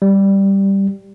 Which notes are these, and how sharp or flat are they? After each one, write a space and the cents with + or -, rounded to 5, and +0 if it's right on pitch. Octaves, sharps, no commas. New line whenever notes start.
G3 +0